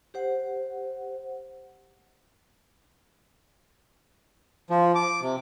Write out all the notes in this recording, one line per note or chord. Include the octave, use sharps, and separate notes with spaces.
G4 C5 F#5
F3
D6
C3